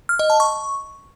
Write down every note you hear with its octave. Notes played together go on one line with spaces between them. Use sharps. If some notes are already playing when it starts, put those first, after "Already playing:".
F6
D#5
A5
C#6